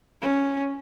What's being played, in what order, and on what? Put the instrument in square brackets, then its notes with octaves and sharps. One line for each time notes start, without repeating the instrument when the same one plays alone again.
[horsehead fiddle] C#4